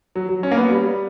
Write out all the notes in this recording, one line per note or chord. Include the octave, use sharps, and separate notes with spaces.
F#3
F#3
C#4
A#3
B3
G3